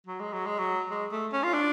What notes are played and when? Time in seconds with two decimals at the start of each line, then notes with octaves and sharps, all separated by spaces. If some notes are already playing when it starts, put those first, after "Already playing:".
0.07 F#3
0.20 G#3
0.33 F#3
0.46 G#3
0.59 F#3
0.91 G#3
1.12 A3
1.33 C#4
1.43 F4
1.54 D4